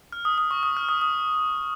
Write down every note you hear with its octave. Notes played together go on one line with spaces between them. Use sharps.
F6
D#6
D#6
C#6
D#6
F6
D#6
D#6